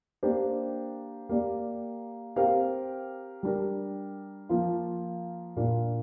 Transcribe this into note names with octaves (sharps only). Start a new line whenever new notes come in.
A#3 D4 G4 C5
A#3 G4 D5
C4 G4 A#4 F5
G3 D4 G4 A#4
F3 A#3 F4
A#2 A#3 D4